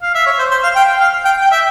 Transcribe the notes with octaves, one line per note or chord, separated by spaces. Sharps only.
F5
E5
C#5
C5
C5
F5
G5
F5
G5
G5
E5